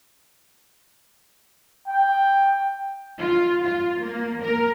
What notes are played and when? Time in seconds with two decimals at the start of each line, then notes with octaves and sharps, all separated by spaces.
1.87 G5
3.20 F4
3.64 F4
4.02 A#3
4.43 A#4